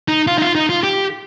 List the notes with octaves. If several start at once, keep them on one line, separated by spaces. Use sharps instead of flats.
D#4
F4
D#4
F4
D#4
F4
G4